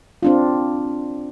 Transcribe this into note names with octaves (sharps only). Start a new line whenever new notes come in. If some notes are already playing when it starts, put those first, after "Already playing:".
C4 D4 F4